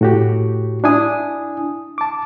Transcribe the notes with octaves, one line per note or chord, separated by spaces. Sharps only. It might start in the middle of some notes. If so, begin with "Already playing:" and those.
A2 F#4 G4
D4 E4 G#5 D#6
A5 D6